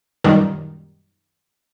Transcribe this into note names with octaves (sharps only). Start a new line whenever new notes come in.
F#2 A#2 D#3 G3